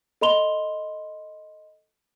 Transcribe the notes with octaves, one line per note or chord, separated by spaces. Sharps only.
A4 D#5 B5 C6 F7 G7